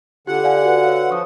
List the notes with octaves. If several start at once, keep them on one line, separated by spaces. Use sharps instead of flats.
D3 F4 G4 F#5
D5 F5 G#5
F#4 B4
C#5 F5
F3 C#6 D#6